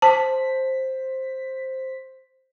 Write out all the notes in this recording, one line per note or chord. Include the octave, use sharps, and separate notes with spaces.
C5 A5 B6